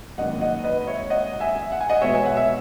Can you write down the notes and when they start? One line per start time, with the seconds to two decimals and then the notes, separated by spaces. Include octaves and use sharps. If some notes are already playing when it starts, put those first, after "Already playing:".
0.18 G#1 F#2 D#3 A#3 D#5 F#5
0.41 D#5 F#5
0.64 B4 D#5
0.87 C#5 E5
1.10 D#5 F#5
1.40 E5 G#5
1.72 F#5
1.81 G#5
1.89 D#5 F#5
2.01 E2 B2 G#3 B3 C#5 E5
2.15 G#5
2.26 F#5
2.37 E5